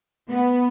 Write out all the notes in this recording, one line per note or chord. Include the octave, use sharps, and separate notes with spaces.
B3